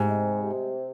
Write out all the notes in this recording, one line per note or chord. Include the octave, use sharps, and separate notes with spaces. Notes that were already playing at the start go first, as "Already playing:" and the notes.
Already playing: G#2 C3
G#3
C3